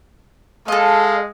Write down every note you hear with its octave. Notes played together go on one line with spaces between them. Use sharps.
G#3 A4 D#5 F5